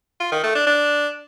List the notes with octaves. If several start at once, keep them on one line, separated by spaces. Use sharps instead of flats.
F4
D#3
A3
D4
D4